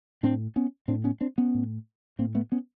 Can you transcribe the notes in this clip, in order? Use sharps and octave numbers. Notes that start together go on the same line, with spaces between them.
A2 C4 D4
B3 C#4
A2 C4 D4
B3 C#4
C4 D4
B3 C#4
A2
A2 A#3 C4
A3 B3
B3 C#4